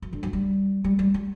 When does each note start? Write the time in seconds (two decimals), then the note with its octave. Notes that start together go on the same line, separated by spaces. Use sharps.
0.02 F#2
0.13 D3
0.23 F#3
0.33 G3
0.84 G3
0.99 G3
1.14 G3